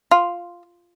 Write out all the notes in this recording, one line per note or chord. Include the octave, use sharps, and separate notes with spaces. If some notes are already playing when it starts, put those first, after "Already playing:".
F4